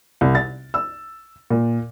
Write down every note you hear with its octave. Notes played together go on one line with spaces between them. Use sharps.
C2
A6
E6
A#2